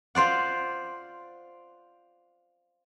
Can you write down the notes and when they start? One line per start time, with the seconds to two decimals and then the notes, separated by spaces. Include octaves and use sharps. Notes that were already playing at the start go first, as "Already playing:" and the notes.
0.15 F4 C5 D5 F#5